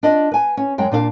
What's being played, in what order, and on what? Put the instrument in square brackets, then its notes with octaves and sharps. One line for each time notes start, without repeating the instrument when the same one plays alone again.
[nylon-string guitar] D4 F4 D5 D#5
B4 G#5
C#4
F#2 G#3 G5
A#2 D4 C5 F5